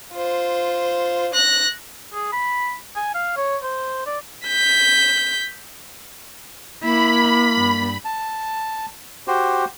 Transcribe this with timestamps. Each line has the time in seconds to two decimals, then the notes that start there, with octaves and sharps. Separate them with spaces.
0.12 F4 C5
1.34 F#6 A#6
2.14 G#4
2.32 B5
2.95 G#5
3.14 F5
3.37 C#5
3.63 C5
4.06 D5
4.47 G6 B6
6.82 A#3 E4 B5
7.55 G2
8.05 A5
9.27 F#4 G4 C5